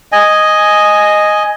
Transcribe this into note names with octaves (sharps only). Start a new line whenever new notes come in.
D#5 G#5